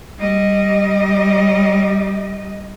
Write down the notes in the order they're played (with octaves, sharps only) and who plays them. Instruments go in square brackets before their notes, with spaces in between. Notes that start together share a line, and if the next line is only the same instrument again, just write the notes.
[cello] G3 D#5